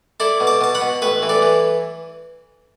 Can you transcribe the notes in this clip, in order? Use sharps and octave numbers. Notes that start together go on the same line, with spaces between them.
E4 A4 D5
B2
A5 D6
B2 A5
F#5 B5
B2
A1 B4 E5
E3
A4 D5
E3